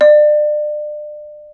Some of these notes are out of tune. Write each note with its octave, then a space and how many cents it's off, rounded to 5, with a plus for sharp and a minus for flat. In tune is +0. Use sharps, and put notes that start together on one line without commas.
D5 +30